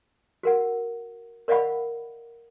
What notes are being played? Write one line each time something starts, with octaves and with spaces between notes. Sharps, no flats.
F#4 A#4 F#5
A#4 D5 D#5 F5 F#5 B5